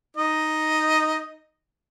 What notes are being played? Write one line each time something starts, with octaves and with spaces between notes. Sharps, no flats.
D#4 D#5